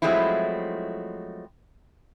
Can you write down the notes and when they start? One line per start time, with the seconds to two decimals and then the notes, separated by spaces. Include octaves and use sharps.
0.02 F3 F#3 G#3 A3 C4 E4